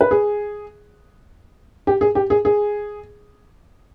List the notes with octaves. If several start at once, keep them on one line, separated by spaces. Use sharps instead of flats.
B4
G#4
G4
G#4
G4
G#4
G#4